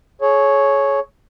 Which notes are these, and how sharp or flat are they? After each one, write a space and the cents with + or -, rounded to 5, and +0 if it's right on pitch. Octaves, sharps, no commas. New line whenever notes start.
G#4 +35 C#5 +0